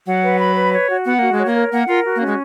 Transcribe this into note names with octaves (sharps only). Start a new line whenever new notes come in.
F#3 F#5
B4
B5
B4
C#5
F#4
B3 F#5
A#3 F#4
G#3
C#5
A#3
A#4
A#3 F#5
F4 A#4
F#4
A#3
C#4
G#3